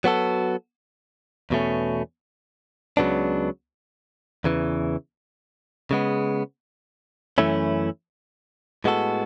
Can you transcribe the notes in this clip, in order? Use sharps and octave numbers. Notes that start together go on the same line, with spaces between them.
F#3 B3 F#4 A4
E2 B2 A3 C#4
C#2 C#3 F#3 B3 D4
E2 C#3 E3
C#3 G#3 B3
F#2 E3 A3 C#4 E4
A2 G#3 B3 F#4 A4